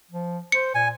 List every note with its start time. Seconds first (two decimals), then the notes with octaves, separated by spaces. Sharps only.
0.11 F3
0.52 C5 C#7
0.75 A#2 G#5